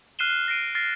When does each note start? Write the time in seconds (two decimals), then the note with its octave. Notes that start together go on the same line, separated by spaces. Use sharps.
0.19 F6 F#6 C7 D#7 E7 G7
0.48 A#6 C7 D7 D#7
0.75 F6 A6 A#6 C7